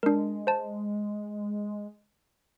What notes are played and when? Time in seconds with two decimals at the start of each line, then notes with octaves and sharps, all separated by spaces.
0.03 G#3 D4 A#4
0.47 C5 A5